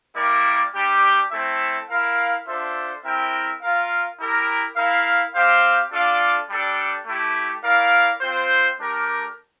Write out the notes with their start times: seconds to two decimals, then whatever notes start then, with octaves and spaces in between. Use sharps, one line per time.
0.16 G3 A#3 E4 A#4 D5
0.75 G3 D4 G4
1.31 A3 C4 E4 A4 E5
1.89 E4 A#4 F5
2.47 D4 F4 A4 C5 E5
3.05 C4 E4 A#4 E5 G5
3.62 F4 A#4 F5
4.19 E4 G4 A#4
4.76 E4 A#4 F5
5.35 C4 G4 C5 F5
5.92 D4 F4 A4 D5 F5
6.49 G3 D4 A4
7.06 A3 E4 G4
7.64 E4 A#4 D5 F5
8.21 C4 F4 C5
8.79 A3 D4 G4 A#4